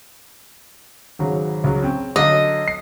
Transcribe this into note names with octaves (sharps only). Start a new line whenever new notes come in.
G#1 C#3 F#3
C#2 F#3
C4 C#4
D3 F#3 D#5 F5
C7